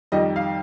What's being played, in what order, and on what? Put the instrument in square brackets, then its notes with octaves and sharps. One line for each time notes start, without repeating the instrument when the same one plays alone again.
[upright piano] F2 D#3 G3 D#5
F5